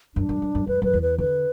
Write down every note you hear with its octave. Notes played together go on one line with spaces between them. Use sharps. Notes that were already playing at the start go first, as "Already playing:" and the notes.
F#2 D4
F#2
F#2
F#2
F#2 B4
F#2 B4
E2
B4
D3 B4